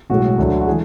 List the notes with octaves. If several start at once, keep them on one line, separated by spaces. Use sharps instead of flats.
B1 A2 G#3 F#4
D2 D3 F#3
F#4
E3 G#3 G#4